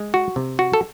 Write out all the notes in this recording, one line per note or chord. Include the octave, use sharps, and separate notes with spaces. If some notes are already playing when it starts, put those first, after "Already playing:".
Already playing: G#3
F#4
C3
F#4
A4